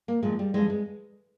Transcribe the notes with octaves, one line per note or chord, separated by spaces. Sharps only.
A#3
A#2 F3 G#3
G3
F2 C#3 E3 G3 G#3
G#3